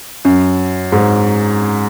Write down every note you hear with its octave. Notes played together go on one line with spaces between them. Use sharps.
F#2
G#2